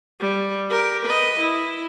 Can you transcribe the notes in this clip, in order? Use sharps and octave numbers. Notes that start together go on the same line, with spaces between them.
G3
G4 A#4
B4 D#5
E4